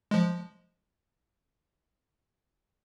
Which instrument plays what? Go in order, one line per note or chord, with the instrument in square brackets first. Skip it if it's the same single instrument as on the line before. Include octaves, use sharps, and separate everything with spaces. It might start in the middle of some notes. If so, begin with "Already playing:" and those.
[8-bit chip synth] F3 G#3